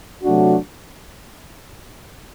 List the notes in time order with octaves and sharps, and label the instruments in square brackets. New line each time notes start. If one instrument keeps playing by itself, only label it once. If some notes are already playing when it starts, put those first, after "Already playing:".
[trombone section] C3 F#3 A3 D4 F#4